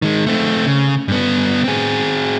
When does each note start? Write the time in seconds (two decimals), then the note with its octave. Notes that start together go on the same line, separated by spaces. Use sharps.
0.02 D#3 G#3
0.26 A3 C4
0.66 C#3
1.08 G2 B3
1.64 C4 G#4